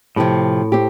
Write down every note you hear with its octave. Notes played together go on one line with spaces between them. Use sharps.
A2 C3 F3 C4 G4
C4 G4